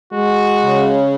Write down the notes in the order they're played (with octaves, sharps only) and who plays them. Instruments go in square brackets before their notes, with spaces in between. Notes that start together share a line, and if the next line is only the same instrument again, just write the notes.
[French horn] G#3 [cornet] F#4
[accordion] C#3